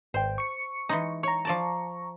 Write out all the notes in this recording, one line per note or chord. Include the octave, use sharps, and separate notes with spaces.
G#1 C5 G5
C#6 C#7
E3 G#3 D#4
C#5 A#5 C#6
F3 D5 A5